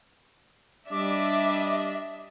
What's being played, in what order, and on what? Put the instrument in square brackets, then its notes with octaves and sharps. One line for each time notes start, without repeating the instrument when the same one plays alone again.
[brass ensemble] G3 D#5 [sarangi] D4 [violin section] E5 [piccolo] D6